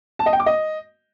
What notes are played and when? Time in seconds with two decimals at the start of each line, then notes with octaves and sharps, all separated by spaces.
0.19 A5
0.26 D#5
0.33 G5
0.40 D6
0.46 D#5